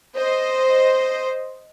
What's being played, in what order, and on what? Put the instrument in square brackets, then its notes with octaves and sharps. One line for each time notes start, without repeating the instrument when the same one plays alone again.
[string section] C5 D#5